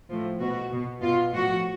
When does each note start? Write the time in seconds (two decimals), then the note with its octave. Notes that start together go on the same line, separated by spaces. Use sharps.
0.09 A2 F3
0.39 B2 F#4
0.71 B2
1.02 B2 F4
1.32 A2 F3 F#4